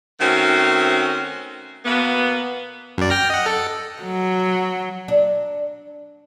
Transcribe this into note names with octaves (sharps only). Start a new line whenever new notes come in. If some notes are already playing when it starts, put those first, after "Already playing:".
D#3 A3 C4 C#4 F#4
B2 A#3 B3
F#2 D5
G5 F6 A#6
D#5 F#5
A4
F#3
D4